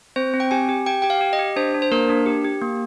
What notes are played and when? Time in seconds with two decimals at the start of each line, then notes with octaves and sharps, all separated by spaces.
0.16 C4 C5
0.34 C4
0.40 G5
0.51 G4 G#5
0.69 G4
0.86 G4 G5
1.02 G4 G5
1.10 F5
1.21 G4
1.33 D#5
1.39 G4
1.56 D4 C5
1.74 D4
1.82 C5
1.92 A#3 A#4
2.09 D4
2.26 G4
2.45 G4
2.62 A#3